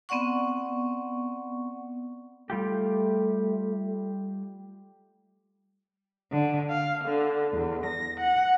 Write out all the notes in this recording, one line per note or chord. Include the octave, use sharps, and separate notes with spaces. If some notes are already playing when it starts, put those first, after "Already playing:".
B3 C4 D5 F#5 C#6
G3 A3 F4 G4
D3
F5
D3
E2
A#6
F#5